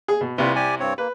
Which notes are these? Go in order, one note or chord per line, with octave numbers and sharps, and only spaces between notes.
G#4
B2
C2 C3 G3 F4 B4
G4 D5 G#5
G2 C4 C#5
A#3 B4